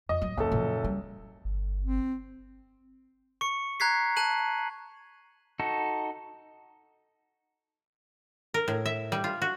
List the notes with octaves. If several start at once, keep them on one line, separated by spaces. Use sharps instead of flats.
F2 D#5
D1 F#3
F#1 D3 F#3 A4
A#2 F3
G3
G1
C4
C#6 C#7
A#5 F#6 G#6 B6 C7
A5 F#6 D#7 F#7
D#4 F#4 A4
A#4
A2
E5
G3
F4
F#4